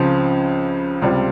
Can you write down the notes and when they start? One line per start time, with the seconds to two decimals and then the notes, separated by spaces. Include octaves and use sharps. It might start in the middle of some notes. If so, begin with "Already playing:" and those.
Already playing: C#2 C#3 F3 C4
1.02 C#2 C3 G3 C4 F4